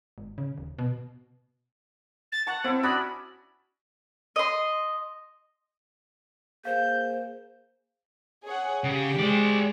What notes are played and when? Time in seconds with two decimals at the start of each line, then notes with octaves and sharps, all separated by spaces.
0.18 G#1
0.38 C#3
0.58 D#1
0.79 B2
2.32 A6
2.47 F#5 A5 C#6
2.64 C4 E4 E5
2.83 C#4 D4 F#4 B5 D#6
4.36 D#5 C6
6.65 A#3 G#4 C5 F5 G6
8.45 G#4 C#5 F#5
8.84 C#3 G4 G5
9.19 G#3 C5 D5